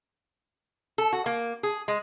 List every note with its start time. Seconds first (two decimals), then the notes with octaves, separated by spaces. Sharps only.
0.98 A4
1.13 F#4
1.26 A#3
1.63 G#4
1.88 G#3